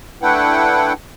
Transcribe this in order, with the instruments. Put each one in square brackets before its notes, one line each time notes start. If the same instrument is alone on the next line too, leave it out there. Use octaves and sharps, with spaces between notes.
[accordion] A3 D4 E4 B4 F#5 G5